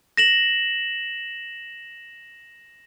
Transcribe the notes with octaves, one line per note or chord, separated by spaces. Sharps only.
A#6 E7 F#7